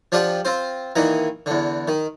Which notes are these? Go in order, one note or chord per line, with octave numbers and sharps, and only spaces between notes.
F3 D4 F4 G4 F#5
C4 F4 C5
A#2 D#3 E3 A#5
E2 D3
D#3